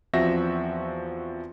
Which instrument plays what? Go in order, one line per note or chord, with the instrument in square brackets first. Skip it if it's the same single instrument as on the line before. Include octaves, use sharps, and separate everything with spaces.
[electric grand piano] E2 F3 C4 F#4 E5 A#6